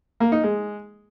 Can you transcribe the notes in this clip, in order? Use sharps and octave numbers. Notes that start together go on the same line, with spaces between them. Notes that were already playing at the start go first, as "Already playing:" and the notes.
A#3
D#4
G#3